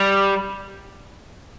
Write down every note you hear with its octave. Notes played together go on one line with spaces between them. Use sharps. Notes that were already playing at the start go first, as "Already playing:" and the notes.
Already playing: G3